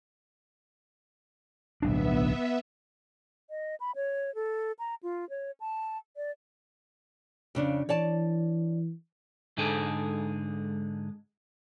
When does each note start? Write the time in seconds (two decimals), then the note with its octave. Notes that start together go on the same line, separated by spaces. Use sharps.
1.82 D1 B1 B3 D4 E5
3.50 D#5
3.80 B5
3.96 C#5
4.35 A4
4.79 A#5
5.03 F4
5.30 C#5
5.60 A5
6.17 D5
7.55 F2 C#3 D4
7.89 E3 C#5 D5 A5
9.58 G#2 D3 G#3 D#4 G#4 A4